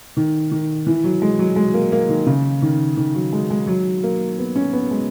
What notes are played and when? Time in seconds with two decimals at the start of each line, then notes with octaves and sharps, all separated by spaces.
0.17 D#3
0.52 D#3
0.87 E3
1.04 F#3
1.22 G#3
1.39 F#3
1.56 G#3
1.74 A#3
1.92 A#3
2.09 D#3
2.26 C#3
2.62 D#3
2.97 D#3
3.15 F#3
3.33 G#3
3.50 G#3
3.67 F#3
4.03 A#3
4.38 B3
4.56 C#4
4.73 B3
4.91 G#3